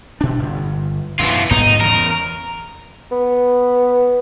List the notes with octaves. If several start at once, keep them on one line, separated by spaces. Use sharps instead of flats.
B2 D4
G1
F#2 B2 E3 F4
G1 G#2 B3 D#4
E2 C#3 A#4
B3